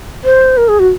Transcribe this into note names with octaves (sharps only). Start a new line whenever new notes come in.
C5
A#4
G#4
F#4